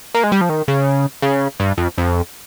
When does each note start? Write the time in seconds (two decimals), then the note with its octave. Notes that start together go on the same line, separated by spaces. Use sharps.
0.14 A#3
0.24 G#3
0.32 G3
0.41 F3
0.49 D#3
0.68 C#3
1.22 C#3
1.60 G2
1.78 F2
1.98 F2